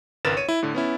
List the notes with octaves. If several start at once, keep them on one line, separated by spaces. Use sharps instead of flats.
G#1 C#2 A#4 B4 A6 E7
C#5 D#7
E4
A2 D3
B3 C#4 E4